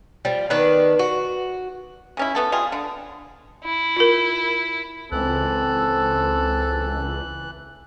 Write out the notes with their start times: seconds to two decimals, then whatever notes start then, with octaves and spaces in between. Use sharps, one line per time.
0.25 F3 G3
0.50 D#3 B3 D4 B4
0.99 F#4
2.17 C#3 C#4 E4
2.35 A3 B3 A4
2.52 G3 F4 G#4
2.72 D3
3.64 E4
3.97 F4 A#4
5.12 C#2 E3 C4 A4 F#6